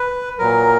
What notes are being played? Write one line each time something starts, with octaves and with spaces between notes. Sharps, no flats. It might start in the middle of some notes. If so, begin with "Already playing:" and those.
Already playing: B4
A#2 F#3 A#4